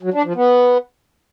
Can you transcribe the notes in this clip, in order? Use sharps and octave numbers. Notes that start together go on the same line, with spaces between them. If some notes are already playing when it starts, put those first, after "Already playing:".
F#3
D4
F3
B3